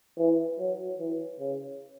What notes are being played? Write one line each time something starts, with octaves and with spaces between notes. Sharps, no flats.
E3
F#3
E3
C#3